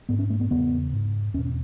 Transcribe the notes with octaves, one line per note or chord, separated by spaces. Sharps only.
G#2 B3
C#4
A3
B3
E2 C#3 B3
G#2
E2 B2 C#4